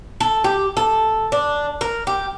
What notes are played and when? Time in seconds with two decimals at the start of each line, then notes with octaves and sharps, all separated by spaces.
0.20 A4
0.44 G4
0.77 A4
1.32 D4
1.81 A#4
2.07 G4